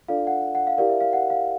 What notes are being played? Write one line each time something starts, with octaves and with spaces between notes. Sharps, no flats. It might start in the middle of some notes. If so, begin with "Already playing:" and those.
D4 F4 A4 D5 F5
F#5
F#5
F5
E4 G4 A#4 D5 F5
E5
F5
F#5
F5